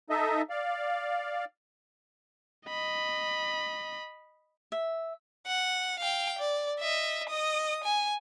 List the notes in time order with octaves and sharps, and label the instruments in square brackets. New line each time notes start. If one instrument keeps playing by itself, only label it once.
[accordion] D#4 A4 D#5 E5
D5 F5
[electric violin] D#5 B5
[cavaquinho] E5
[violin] F#5
F5 G5
D5
D#5 E5
D#5 D#6
G#5